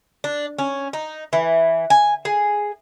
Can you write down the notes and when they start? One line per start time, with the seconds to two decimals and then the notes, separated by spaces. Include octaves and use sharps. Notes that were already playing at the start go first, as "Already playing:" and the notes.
0.24 D4
0.59 C#4
0.93 D#4
1.33 E3
1.90 G#5
2.25 G#4